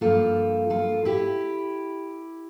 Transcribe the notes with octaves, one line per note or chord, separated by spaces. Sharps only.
G2 F3 A#3 F4 A4
F4 A4
E4 G4